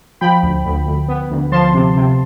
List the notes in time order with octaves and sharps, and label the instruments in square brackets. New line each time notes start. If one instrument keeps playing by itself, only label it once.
[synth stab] F3 G5 B5
D2
D2
D2
B3
D2
F3 A5 C6
C3
C3